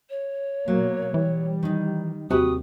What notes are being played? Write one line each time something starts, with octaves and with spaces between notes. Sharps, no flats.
C#5
B2 F#3 A#3
E3 G3
D#3 D#4
D#2 C3 F#4 G4 B4 D#6